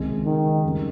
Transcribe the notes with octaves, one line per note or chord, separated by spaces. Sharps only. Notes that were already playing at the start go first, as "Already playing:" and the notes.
Already playing: C#2 C3 D#3 G#3 C4
D#3
F2 C#3 G3